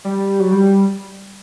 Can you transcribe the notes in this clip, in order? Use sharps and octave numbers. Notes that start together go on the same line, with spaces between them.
G3
F#3
G3